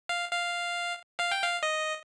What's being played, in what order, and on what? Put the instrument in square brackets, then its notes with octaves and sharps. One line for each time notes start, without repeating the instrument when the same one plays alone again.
[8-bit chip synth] F5
F5
F5
G5
F5
D#5